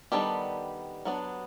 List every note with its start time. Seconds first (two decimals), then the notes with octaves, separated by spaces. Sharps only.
0.12 D#3 G3 B3 D4 G4 A4
1.05 F#3 B3 D4